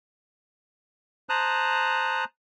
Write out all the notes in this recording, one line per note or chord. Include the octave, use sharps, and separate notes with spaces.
C5 A5 A#5 D#6 F#6